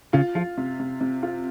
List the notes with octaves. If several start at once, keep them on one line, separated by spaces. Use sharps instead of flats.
C#3 F4
F3 F4
C3
C3
C3
F4